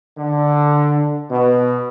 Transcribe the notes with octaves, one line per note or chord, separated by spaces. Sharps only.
D3
B2